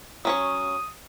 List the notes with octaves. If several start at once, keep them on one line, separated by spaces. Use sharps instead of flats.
F#3 C#4 C#5 D#6